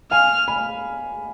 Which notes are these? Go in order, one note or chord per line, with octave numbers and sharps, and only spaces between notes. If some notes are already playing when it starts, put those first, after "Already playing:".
F5 G#5 F6
G#5 B5